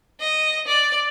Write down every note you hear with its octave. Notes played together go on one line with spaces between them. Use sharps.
D#5
D5